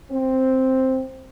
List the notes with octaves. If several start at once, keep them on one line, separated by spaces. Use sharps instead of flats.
C4